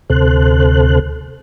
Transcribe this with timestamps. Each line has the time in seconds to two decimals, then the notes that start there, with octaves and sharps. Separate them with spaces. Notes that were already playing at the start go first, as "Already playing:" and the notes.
0.10 D2 C3 A4 C5 F#6